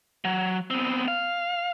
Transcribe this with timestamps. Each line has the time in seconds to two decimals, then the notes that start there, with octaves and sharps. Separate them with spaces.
0.25 F#3
0.71 B3 C4
1.08 F5